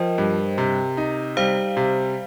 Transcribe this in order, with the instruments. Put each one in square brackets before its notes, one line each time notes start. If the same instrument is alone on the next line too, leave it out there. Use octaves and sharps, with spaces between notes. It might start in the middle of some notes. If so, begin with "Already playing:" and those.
Already playing: [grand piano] F3 [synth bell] A#4 C5 D#5 G5
[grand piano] G2
C3
D#4
[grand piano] G3 [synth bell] C5 F5
[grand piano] C3